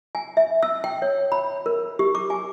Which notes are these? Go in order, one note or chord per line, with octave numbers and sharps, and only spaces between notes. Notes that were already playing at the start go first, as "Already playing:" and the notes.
G#5
E5
E6
G5
C#5
B5
A#4
G4
D6
G#5